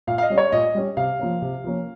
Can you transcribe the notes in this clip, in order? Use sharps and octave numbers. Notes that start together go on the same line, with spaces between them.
A#2 F5
F5
D#5
G3 C#4
C#5
A#2 D#5
G3 C#4
C3 F5
F3 A#3 C#4
C3
F3 A#3 C#4